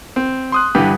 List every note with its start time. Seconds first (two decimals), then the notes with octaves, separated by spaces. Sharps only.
0.16 C4
0.52 C6 D#6 F#6
0.75 G2 D3 E3 G4